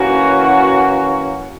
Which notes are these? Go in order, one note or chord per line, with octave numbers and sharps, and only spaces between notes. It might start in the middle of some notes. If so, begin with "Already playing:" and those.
Already playing: E3 A#3 C#4 F#4